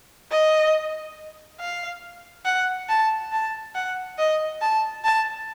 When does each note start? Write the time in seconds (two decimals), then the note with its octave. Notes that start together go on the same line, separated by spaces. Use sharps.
0.31 D#5
1.60 F5
2.45 F#5
2.89 A5
3.32 A5
3.75 F#5
4.18 D#5
4.61 A5
5.04 A5